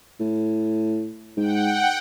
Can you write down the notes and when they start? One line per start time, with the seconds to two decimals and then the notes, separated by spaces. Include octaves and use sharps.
0.20 A2
1.37 G#2 F#5 G5